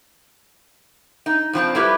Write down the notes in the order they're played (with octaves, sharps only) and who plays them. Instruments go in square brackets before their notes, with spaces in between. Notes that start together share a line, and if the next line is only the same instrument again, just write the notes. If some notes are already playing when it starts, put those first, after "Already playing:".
[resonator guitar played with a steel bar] D#4
G2 F3 C4 A5
G3 A3 E4 G4 B4